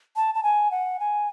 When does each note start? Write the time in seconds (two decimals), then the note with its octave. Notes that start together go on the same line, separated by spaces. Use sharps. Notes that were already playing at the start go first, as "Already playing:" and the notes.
0.16 A5
0.35 A5
0.43 G#5
0.71 F#5
1.00 G#5